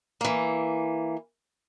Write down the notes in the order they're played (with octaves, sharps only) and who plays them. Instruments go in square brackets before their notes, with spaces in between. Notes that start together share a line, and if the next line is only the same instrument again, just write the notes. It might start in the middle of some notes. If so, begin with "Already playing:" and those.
[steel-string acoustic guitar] E3 A#3